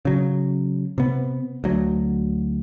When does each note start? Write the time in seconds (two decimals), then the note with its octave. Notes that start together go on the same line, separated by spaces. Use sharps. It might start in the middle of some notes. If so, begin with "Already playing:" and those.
0.05 C#3 F#3
0.98 C3 B3
1.64 D2 F#3